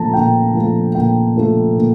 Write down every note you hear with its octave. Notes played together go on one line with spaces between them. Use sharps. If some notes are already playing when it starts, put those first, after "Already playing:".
Already playing: A#2 F3 A3 A5 A#5
A#2 G5
F3 A3
A#2 G5
F3 A3
A#2